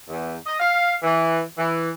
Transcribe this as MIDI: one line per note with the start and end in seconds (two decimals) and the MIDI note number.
0.09 0.34 40
0.47 0.59 75
0.60 0.95 77
1.03 1.41 52
1.57 1.90 52